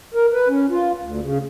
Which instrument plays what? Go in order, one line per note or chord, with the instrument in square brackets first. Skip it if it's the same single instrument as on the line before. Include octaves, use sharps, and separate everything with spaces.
[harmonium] A#4
B4
C#4
F4
D2
C#3